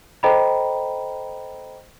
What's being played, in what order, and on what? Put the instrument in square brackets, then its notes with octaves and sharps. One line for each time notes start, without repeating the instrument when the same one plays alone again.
[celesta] A4 C5 D#5 G5 A#5 B5